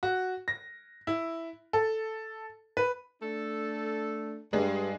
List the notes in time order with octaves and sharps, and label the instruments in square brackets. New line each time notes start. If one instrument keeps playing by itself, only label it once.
[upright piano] F#4
A#6
E4
A4
B4
[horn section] A3 D4 A4
[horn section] G2 [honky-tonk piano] G#3 D4 G#4